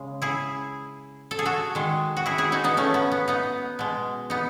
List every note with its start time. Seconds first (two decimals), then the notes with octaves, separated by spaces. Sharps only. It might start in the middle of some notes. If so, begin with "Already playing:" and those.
Already playing: C#3 G#3
0.22 E4 G#4
1.31 A4
1.39 G#4
1.46 F#4 A4
1.75 D#3 G#3
2.17 F#4
2.26 E4 G#4
2.38 E4 G#4
2.52 D#4 F#4
2.64 B3 D#4
2.77 A3 C#4
2.94 B3
3.12 B3
3.28 B3 D#4
3.79 B2 G#3
4.30 B3 D#4